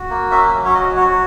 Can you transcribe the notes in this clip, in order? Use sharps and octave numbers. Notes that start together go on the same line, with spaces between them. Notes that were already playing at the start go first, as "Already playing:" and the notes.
Already playing: F#4
A#3
C#4 E5
F#3
C#5
F#4 D#5
F#4 C#5